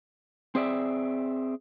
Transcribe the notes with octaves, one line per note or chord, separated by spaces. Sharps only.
C4 G#4 D5 E5